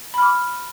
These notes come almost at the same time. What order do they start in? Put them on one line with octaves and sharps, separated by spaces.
B5 F6 D6